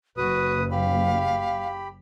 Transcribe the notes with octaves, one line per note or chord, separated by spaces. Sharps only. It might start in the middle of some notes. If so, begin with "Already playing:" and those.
F#1 F#4 B4 D#6
G4 F5 B5